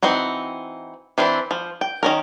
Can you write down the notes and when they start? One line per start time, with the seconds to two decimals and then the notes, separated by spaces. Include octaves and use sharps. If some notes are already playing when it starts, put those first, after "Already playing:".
0.03 E3 C4 D#4 F#4
1.18 E3 C4 D4 E4
1.51 F3
1.81 G5
2.03 D#3 C#4 A#4